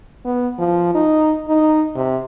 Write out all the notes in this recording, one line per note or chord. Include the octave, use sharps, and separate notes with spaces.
B3
F3
D#4
D#4
C3